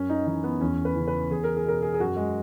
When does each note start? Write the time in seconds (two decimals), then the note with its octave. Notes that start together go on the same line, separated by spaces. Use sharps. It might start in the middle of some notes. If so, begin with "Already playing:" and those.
Already playing: F#2 C#4
0.09 D#4
0.27 E3 D#4
0.44 B3
0.61 E2 C#4
0.85 B4
0.95 C#3 E3
1.08 B4
1.30 E2 G#4
1.44 A#4
1.57 G#4
1.65 B2 A#4
1.82 G#4
1.94 G#4
2.00 F#2 F#4
2.17 G#3